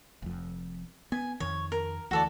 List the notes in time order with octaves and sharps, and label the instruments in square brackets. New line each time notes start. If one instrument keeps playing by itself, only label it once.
[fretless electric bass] F1 F2
[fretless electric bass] B3 [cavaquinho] G#5
[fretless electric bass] F2 D#3 [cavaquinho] C#5
[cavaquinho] A#4
[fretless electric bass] D2 E3 [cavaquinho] F#4 A4 D5